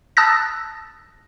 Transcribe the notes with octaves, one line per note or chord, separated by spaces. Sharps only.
A5 D#6 E6 F#6 A6 A#6